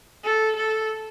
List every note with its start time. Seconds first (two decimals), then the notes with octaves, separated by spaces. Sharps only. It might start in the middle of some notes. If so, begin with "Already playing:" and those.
0.24 A4
0.56 A4